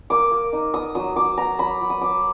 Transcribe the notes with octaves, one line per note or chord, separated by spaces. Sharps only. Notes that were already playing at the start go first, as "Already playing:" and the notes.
A#3 D6
A#3
D#4
B3 D#6
F#3 D#6
F#3 D6
B3 A#5
F#3 B5
F#3
D#6
F#3 D6